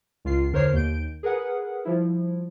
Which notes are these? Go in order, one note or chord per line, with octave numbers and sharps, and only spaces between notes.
C#2 F4 C7
E2 D3 A#4 C5 C#5 C7
D#2 G6 D7
G#4 A#4 B4 F#5
F3 G3 E4